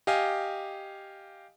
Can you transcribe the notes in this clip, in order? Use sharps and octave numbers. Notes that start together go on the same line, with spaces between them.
G4 D#5 F5 G#5